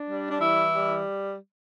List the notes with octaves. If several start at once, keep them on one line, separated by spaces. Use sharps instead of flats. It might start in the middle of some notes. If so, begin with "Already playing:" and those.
Already playing: D4
G3
D4
E3 E4
G3